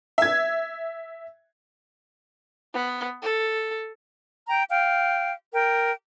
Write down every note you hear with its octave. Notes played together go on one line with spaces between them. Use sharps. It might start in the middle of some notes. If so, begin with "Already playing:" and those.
E5 G#6
B3
A4
G5 A#5
F5 G5
A#4 G5